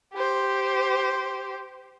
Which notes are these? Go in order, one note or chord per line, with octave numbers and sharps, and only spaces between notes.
G4 C5